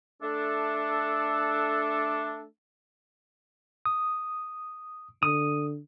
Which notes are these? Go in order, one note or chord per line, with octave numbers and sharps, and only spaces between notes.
A3 D4 A4
D#6
D3 D#6